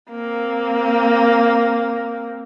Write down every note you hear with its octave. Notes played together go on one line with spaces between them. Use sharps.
A#3 C4